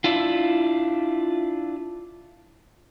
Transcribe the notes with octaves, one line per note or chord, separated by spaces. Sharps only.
D4 E4 F4